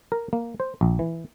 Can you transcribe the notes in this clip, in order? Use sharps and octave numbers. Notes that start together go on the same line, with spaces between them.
A#4
A#3
C5
A#1
E3